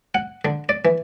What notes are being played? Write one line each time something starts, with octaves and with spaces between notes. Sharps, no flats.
F#5
D3
D5
E3